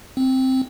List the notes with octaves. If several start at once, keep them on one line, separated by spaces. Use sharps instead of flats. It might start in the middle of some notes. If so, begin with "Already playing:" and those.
C4